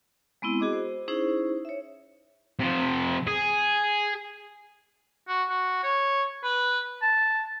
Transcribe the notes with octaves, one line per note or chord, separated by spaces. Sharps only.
G#3 B3 C4 E4
F#4 G#4 D#5 D6
C5
C#4 D#4 E4 G#4 C5
C#5 E5
C3 F3
G#4
F#4
F#4
C#5
B4
A5